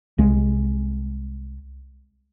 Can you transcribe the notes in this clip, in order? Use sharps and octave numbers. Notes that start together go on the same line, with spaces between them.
C2 G#3